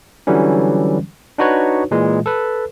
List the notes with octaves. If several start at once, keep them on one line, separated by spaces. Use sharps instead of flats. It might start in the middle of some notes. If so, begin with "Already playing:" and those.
D3 E3 F#3 G3 C#4
D4 D#4 F#4 B4 C#5
A#2 E3 G#3
A4 B4